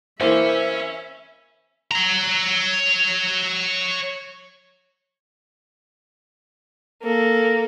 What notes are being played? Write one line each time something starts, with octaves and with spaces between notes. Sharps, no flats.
E3 A#3 C#4 E4 C5 E5
C#5 A#5
A#3 A4